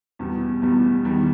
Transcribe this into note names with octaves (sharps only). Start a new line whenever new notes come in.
E2 B2 G3
E2 B2 G3
E2 D#3 G3